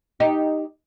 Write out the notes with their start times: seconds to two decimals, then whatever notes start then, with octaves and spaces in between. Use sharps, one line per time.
0.20 D#4 G4